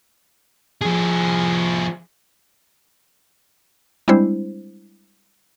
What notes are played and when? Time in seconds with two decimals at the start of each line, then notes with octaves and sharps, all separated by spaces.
0.81 F3 G#4
4.08 G3 G#3 C4 D4 E4 C5